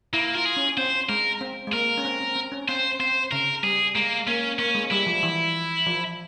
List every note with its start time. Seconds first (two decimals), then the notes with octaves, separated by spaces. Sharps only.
0.13 A#3 E4
0.35 F4 A#4
0.45 G#4
0.57 C#4
0.77 C4 C5
1.09 G#3 A#4
1.41 C4
1.67 G#3
1.73 A#3 A#4
1.98 C#4
2.05 C4
2.21 C4
2.36 C4
2.52 C#4
2.68 C4 C5
2.99 C4 C5
3.31 C#3 A#4
3.63 G3 G#4
3.95 G#3 A#3
4.27 A#3 C#4
4.59 A#3 C#4
4.75 G#3
4.91 G3 E4
5.06 F3
5.23 E3
5.86 F3